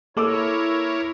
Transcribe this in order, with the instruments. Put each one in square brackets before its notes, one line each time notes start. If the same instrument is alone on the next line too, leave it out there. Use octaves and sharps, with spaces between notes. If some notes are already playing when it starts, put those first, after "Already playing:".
[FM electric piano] A#3 [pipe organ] E4 A#4 C#5 [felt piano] A4 D6 E6